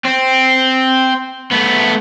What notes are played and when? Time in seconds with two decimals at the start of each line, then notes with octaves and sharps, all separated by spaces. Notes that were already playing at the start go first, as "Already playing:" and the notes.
0.05 C4
1.52 A3 B3